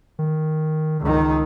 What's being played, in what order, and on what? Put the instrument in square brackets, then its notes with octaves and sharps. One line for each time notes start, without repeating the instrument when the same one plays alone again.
[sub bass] D#3
[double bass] C#2 D#3